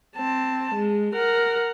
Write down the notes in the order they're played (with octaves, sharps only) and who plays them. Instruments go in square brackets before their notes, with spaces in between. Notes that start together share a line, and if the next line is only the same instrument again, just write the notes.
[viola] C4 A5
G#3
A#4 F#5